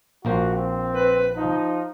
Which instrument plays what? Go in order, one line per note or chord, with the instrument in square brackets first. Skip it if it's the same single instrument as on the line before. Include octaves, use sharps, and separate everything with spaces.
[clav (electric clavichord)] A#1 A#3 C5 [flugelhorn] F#4
[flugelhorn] C4
[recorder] B4
[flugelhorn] F3 [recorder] D#4